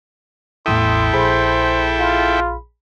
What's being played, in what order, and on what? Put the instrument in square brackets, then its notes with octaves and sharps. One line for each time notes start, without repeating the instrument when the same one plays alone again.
[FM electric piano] A1 E2 D#6 [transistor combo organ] E4 A4 G5 [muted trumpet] C6
[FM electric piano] A#1 G#4 B5 [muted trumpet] C5
[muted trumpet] F4